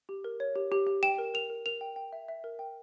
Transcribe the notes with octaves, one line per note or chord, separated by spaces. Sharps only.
G4
A#4
C#5
G4
G4
G4
G5 E7
A#4
A#4 F7
A#4
A#4 F7
G5
G5
E5
E5
A#4
G5